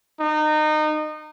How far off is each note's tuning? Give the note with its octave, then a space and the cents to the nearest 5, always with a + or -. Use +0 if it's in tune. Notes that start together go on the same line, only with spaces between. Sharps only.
D#4 -25